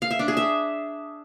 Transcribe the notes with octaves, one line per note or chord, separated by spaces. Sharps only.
F5
E5
D4
G#4
E5